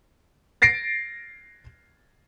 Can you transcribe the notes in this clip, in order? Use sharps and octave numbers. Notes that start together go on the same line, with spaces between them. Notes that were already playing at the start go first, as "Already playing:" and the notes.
A6 A#6 C7 D7